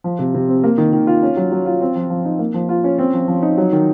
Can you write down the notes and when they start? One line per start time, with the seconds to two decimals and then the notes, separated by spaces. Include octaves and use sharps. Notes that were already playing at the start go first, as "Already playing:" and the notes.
0.04 F3
0.19 C3
0.35 C3
0.49 C4
0.64 A#3
0.78 D#3
0.93 D#3
1.07 F4
1.23 C#4
1.37 F#3
1.52 F#3
1.66 F4
1.81 C4
1.96 F3
2.10 F3
2.25 D#4
2.39 A#3
2.54 F3
2.69 F4
2.84 C#4
2.99 C4
3.14 F3
3.28 F3
3.42 D#4
3.58 F#3
3.72 D#3